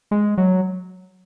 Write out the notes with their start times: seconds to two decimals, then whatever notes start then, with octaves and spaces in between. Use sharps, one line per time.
0.11 G#3
0.38 F#3